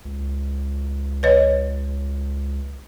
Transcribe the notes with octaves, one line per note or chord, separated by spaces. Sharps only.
C#2
B4 C#5 D#5